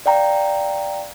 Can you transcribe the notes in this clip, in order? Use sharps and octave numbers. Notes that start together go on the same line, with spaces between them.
D5 F5 G5 A#5